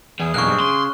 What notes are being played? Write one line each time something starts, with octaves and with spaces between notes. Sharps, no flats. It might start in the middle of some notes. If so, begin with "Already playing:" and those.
E2 G#4
B1 E2 D3 A#3 C#6 F6 F#6
G2 A#3 C4
C#3 C6